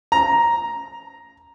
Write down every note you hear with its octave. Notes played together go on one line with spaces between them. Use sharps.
A#5